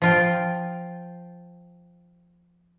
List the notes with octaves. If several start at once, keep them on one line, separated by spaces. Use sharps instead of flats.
F3 F4 G5